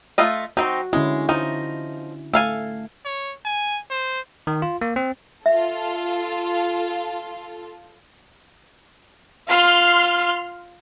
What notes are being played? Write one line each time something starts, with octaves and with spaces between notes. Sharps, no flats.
A3 F4 D#5
C4 D#4 F#4
D3 G#3 C#4 E4
F3 D#4 E4
A3 A4 F5 G#5
C#5
G#5
C5
D#3
F4
A#3
C4
F4 A4 E5
F4 C6 F6